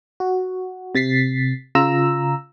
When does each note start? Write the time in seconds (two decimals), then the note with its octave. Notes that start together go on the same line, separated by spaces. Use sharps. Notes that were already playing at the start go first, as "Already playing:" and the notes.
0.20 F#4
0.95 C3 A6 B6 C7
1.75 C#3 F4 A#5 E6